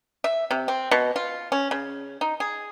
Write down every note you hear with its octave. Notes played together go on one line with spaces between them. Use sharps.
E5
C3
C4
B2
F4
C#4
C#3
D#4
G#4